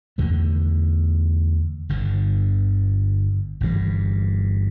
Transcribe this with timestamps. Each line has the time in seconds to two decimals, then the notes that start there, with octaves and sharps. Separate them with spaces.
0.18 E2 D3 A3
1.89 G1 G2 D3
3.61 G1 G2 E3 G3